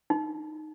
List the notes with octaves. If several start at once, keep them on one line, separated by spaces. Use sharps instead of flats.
D#4